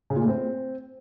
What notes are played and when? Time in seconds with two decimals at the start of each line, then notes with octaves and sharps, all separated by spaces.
0.10 C#3
0.16 A#2
0.22 A2
0.28 C4